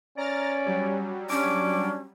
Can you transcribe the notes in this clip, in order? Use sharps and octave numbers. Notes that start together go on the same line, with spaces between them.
C#4 D5 A#5 F6 A6
F#3 G3
C#4 D4 D6